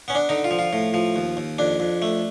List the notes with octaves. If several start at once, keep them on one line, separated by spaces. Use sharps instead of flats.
B3 C#4
D4
D3 D#4
F4
F3
F4
A2
F3
D#2
D#2
F2 D4
F2
A3